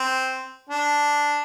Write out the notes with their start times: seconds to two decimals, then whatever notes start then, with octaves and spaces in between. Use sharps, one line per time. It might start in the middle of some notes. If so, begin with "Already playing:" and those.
Already playing: C4
0.69 D4